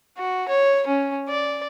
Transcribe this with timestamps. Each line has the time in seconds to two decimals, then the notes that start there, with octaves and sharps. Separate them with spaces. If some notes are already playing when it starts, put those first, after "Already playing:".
0.18 F#4
0.49 C#5
0.87 C#4
1.29 D5